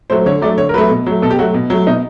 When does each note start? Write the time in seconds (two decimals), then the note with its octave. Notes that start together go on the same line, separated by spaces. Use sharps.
0.10 F#3 A3 C5
0.26 D3 C#5
0.42 F#3 A3 D5
0.57 D3 C#5
0.69 A#4
0.74 F#3 A3 B4
0.90 B2
1.06 F#3 A3
1.22 B2 A4
1.31 G4
1.39 F#3 A3 F#4
1.54 B2
1.70 F#3 A3
1.86 B2 D#4